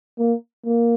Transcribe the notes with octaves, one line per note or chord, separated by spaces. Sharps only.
A#3
A#3